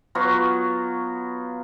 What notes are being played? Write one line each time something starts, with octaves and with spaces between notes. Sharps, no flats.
F#3 B3 F4 F#4